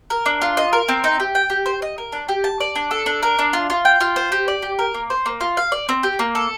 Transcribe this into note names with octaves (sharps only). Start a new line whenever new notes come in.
A#4
D4
F4
D#5
A#4
C4
D#4
G4
G5
G4
C5
D#5
A#4
D4
G4
A5
D5
D4
A4
D4
A#4
D4
F4
F4
G5
F4
C5
G4
D5
G4
A#4
A#3
C5
A#3
F4
F5
D5
C4
G4
A#3
A4